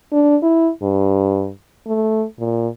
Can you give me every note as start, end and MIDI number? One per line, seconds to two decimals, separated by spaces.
0.12 0.37 62
0.43 0.70 64
0.82 1.50 43
1.87 2.25 57
2.39 2.68 46